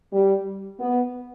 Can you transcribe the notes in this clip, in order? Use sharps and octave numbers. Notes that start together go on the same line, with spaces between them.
G3
B3